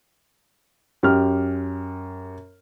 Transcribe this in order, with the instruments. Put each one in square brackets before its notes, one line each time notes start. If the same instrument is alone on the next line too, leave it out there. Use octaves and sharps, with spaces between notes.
[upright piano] F#2 G4 F6